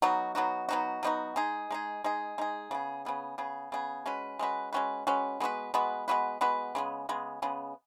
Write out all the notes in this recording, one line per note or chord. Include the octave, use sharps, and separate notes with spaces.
F#3 B3 D#4 F#4
F#3 B3 D#4 F#4
F#3 B3 D#4 F#4
F#3 B3 D#4 F#4
G#3 D#4 G#4
G#3 D#4 G#4
G#3 D#4 G#4
G#3 D#4 G#4
C#3 B3 G#4
C#3 B3 G#4
C#3 B3 G#4
C#3 B3 G#4
G#3 C#4 F#4 B4
G#3 C#4 F#4 B4
G#3 C#4 F#4 B4
G#3 C#4 F#4 B4
G#3 B3 F#4 B4
G#3 B3 F#4 B4
G#3 B3 F#4 B4
G#3 B3 F#4 B4
C#3 G#3 B3
C#3 G#3 B3
C#3 G#3 B3